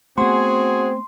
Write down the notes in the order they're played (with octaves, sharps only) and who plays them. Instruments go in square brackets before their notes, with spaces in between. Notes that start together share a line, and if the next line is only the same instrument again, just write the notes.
[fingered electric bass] A3 B3 [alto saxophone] C4 [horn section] F#4 G#4 [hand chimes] C6